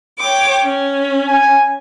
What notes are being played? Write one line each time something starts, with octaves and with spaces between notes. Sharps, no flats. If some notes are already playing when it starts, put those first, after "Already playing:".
C#5 G5 D6
C#4
G#5